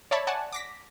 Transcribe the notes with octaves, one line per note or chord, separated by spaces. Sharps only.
C#5 D5 E5 A5 B5 C#6
D5 F#5 G#5 A5
D6 A#6 B6